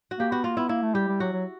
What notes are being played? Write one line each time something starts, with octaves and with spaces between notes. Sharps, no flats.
F#4
A#3 G4
B3 F#4
A#3 F4
B3 E4
A#3 E4
A3
G3 G4
G3
F#3 F#4
F#3